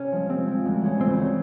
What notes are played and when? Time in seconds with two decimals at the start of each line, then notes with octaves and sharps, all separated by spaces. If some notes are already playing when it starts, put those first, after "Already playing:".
Already playing: C3 C#4
0.12 F3 G#3
0.29 C3 C4
0.47 F3 G#3
0.65 D2
0.81 C#3 E3 G#3 C#4
1.01 D2 C4
1.18 C#3 E3 G#3 C#4